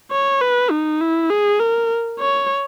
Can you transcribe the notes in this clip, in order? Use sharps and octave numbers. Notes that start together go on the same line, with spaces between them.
C#5
B4
D#4
E4
G#4
A#4
C#5